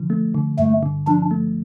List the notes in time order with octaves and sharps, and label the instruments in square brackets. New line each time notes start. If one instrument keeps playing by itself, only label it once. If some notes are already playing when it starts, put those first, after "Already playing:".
Already playing: [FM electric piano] D3 F3
A3
D3
[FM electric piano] G2 [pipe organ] A3
[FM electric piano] D3
[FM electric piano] F3 [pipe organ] D4
[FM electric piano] A3